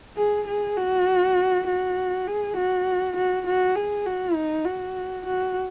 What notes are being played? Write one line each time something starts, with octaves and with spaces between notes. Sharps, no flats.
G#4
G#4
F#4
F#4
G#4
F#4
F#4
F#4
G#4
F#4
D#4
F#4
F#4